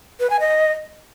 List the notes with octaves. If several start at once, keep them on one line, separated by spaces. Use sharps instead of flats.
B4
G#5
D#5